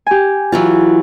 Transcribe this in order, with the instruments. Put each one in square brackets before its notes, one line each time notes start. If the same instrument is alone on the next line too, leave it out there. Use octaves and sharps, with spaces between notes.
[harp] G4 G#5
[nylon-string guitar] E3 F#3 F4